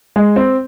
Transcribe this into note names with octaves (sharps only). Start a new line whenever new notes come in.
G#3
C4